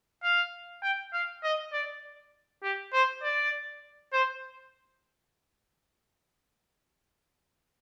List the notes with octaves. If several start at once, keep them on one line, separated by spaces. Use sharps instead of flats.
F5
G5
F5
D#5
D5
G4
C5
D5
C5